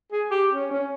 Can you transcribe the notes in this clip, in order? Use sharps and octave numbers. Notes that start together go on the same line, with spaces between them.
G#4
G4
C#4
C#4